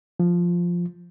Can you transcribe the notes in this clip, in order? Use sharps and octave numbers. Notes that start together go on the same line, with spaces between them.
F3